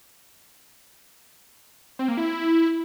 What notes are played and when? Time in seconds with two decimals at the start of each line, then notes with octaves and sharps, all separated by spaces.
1.99 C4
2.08 A#3
2.17 E4